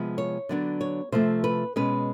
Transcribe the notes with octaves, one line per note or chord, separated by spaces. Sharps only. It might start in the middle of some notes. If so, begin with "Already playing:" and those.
Already playing: C3 F3 G#3 B3
C#5
D3 F#3 B3 D4
C#5
C3 F3 A3 C4 C5
B4
B2 G#3 C#4 B4